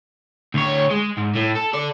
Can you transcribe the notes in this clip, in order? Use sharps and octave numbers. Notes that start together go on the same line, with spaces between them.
D2 C#5
G#3
G#2
A2
A4
A4 D5